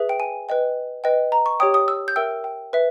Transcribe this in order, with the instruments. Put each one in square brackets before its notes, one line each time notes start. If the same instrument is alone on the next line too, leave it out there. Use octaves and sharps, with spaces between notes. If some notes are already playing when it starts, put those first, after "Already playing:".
Already playing: [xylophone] G#4 B4 E5
G5
G#5
B4 D#5 G5
B4 D#5 G5
A#5
C#6
G4 C#5 G5 D#6
D#6
E6
G6
A#4 E5 G5 E6
G5
B4 E5